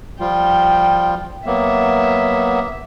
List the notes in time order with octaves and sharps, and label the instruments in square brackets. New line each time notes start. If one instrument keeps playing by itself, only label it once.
[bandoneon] F3 G3 F4 [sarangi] G5
[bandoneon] F#3 A#3 B3 [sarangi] E5